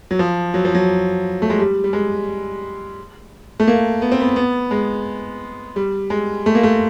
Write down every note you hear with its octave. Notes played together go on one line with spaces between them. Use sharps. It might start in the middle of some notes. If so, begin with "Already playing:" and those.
F#3
F3
F#3
F3
F#3
A3
G#3
G3
G3
G#3
A3
A#3
B3
C4
B3
B3
G#3
G3
G#3
A3
A#3
A3